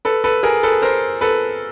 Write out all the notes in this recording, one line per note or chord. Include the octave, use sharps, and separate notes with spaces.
A4 B4
A4 B4
G#4 A#4
A4 B4
A#4 C5
A4 B4